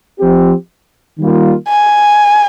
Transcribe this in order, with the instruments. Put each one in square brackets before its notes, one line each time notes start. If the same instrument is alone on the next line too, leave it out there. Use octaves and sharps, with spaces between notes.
[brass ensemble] F3 C4 G4
D#3 G3 A#3 F4
[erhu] G#5